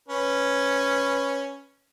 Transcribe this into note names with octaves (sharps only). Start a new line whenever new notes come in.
C#4 B4